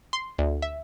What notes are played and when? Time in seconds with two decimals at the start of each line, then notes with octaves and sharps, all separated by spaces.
0.13 C6
0.38 D2
0.62 E5